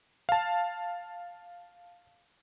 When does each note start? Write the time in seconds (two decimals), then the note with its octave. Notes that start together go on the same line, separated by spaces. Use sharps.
0.29 F5 A5